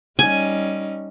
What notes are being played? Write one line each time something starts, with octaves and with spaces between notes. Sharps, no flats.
G3 C#4 D#4 G#5